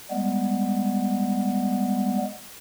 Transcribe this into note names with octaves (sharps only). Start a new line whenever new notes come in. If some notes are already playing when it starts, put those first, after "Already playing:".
G3 G#3 B3